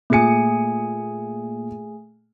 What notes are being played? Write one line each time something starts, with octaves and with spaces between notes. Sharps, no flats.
A#2 A3 G#4 G#5 C#7